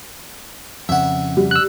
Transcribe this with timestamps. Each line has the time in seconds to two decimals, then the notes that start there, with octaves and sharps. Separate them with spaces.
0.89 F2 C#3 E5 F#5
1.37 G3
1.51 E6 F#6